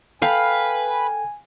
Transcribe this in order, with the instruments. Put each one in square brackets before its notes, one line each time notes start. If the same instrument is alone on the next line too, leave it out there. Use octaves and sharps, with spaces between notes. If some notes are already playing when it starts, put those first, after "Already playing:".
[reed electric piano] A4 G5 [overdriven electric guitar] B4 [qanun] F5 [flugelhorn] G#5